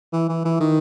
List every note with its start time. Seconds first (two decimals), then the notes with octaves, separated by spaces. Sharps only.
0.13 E3
0.29 E3
0.45 E3
0.60 D#3